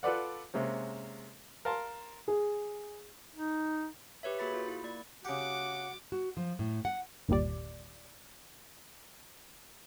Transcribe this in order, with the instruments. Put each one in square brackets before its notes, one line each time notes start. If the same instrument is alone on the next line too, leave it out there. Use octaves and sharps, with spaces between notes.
[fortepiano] F4 A4 B4 D5 F#5
C3 G#3 A#3 C#4
A#4 F5 A5 C6
[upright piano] G#4
[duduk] D#4
[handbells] G4 B4 C#5 E5
A#3 F#4 G#4 B5 A6 B6
F4
E4
A#3 D5
[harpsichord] C#3 G4 [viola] F#4 D6 [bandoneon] F#5
[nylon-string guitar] F#4
F3
A2
F#5
[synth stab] G1 D#2 A#2 G3 D5